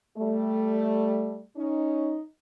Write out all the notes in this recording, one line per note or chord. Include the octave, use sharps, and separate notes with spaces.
G3 A3
C#4 D#4